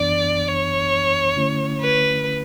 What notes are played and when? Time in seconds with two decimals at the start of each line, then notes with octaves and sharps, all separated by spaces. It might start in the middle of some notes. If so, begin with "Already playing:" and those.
Already playing: F#2 E3 B3 D4 D5
0.48 C#5
1.36 D3 A3 C#4 E4
1.81 B4